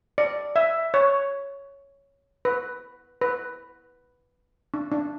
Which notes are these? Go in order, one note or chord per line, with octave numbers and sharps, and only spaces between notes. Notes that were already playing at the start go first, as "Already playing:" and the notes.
D5
E5
C#5
B4
B4
D4
D4